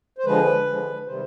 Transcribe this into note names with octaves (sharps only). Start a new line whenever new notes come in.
C5
D3 F3 G#3 B4
D3 F3 G#3
C3 D#3 G3 C5